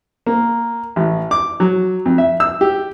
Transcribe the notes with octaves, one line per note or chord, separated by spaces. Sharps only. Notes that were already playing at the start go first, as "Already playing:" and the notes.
A#3
A1
D6
F#3
F2
E5
E6
G4